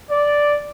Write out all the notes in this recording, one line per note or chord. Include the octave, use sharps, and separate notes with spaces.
D5